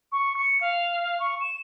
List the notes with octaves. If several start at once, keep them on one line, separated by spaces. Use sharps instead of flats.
C#6
C#7
F5
C#6
E7